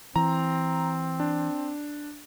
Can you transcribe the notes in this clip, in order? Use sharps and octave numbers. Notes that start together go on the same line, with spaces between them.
E3 C4 A#5
D4